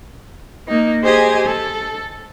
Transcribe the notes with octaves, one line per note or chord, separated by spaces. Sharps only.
A#3 D#4
G4 G#4 C5 D#5 G#5
A4